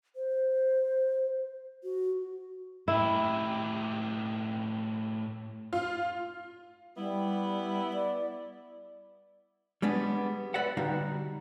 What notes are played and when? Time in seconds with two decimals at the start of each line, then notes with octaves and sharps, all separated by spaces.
0.16 C5
1.84 F#4
2.88 A2 E4 G4
5.73 F4
6.97 G3 B3 E4
7.93 D5
9.82 G3 G#3 B3 D4
10.54 B4 D5 E5 F#5
10.77 D3 G3 D#4 F#4 F5